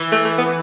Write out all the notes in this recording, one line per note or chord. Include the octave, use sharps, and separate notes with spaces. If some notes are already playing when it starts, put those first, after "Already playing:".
Already playing: E3
A3
A3
B3